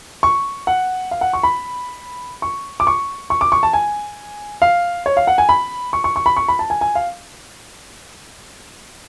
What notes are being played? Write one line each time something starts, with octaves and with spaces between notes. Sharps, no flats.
C#6
F#5
F5
F#5
C#6
B5
C#6
D6
C#6
C#6
D6
C#6
A5
G#5
F5
C#5
F5
F#5
G#5
B5
C#6
C#6
C#6
B5
C#6
B5
A5
G#5
G#5
F5